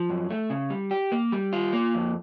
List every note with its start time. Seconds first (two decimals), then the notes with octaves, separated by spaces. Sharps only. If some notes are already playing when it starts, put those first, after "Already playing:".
Already playing: F3
0.10 F#2
0.30 A3
0.50 C#3
0.70 G3
0.91 G4
1.12 A#3
1.32 G3
1.53 F4
1.73 A#3
1.95 F2